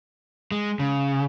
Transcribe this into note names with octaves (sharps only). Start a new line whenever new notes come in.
G#3
C#3